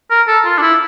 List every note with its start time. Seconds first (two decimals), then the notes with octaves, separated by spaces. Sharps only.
0.11 A#4
0.28 A4
0.45 F4
0.58 D4
0.62 E4